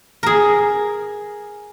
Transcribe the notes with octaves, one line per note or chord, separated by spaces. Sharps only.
G#4 A#4